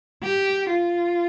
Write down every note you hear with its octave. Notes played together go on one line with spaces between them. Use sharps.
G4
F4